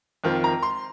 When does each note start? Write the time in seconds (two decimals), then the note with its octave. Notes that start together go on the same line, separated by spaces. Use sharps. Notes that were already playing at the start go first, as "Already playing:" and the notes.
0.24 F2 D#3 C4 F4
0.44 A#5
0.62 C6